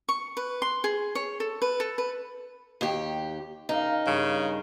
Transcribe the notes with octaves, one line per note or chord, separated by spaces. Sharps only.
C#6
B4
C6
G#4
C#5
A4
B4
A4
B4
D#2 G4
C#3 D#4 A#4 F5
G2 C#3